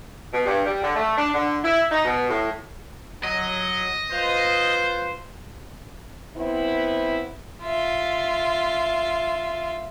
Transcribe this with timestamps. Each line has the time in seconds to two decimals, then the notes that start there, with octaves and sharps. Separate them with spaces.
0.32 B2
0.45 G2
0.65 G3
0.81 D3
0.95 A3
1.17 D4
1.33 D3
1.62 E4
1.91 D#4
2.04 B2
2.29 A2
3.23 F#3 D#5
4.11 F4 B4 C5
6.37 B3 C4 E4
7.63 F4 E5